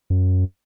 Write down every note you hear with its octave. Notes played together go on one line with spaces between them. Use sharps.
F#2